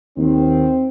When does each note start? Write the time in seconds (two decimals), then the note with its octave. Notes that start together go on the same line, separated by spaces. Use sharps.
0.16 D#2 D#3 C4